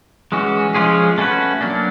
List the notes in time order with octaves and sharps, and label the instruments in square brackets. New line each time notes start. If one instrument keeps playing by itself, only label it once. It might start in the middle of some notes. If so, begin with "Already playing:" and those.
[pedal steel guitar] E3 G#3 C#4 F#4
F3 G#3 C#4 F4 G#4
A3 C#4 F#4 B4
F#3 A#3 D4